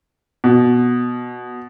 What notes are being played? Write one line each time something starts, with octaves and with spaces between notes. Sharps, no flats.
B2